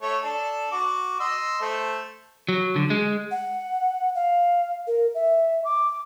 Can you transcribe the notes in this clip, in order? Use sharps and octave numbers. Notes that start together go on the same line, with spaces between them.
A3 C#5
D4 A4 A5
F#4 D6
D#5 C6 E6
A3 C5
F#3
D3
G#3
F#5
F5
A#4
E5
D6